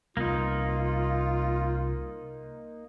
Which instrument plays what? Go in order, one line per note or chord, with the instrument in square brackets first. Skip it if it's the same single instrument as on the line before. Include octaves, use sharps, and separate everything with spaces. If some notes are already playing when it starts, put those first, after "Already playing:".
[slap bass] C2 B3 [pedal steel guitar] A#3 D#4 [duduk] F4